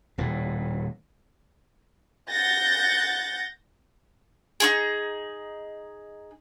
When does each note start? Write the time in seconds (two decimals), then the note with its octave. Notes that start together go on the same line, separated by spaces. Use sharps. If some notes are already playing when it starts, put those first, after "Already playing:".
0.18 D#1 A2
2.29 F#5 G6 A6 A#6
4.60 D#4 F4 G#4